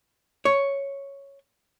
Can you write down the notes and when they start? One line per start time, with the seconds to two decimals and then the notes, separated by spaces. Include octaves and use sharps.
0.45 C#5